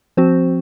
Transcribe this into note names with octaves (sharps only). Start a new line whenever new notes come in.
F3 C4 F#4 C5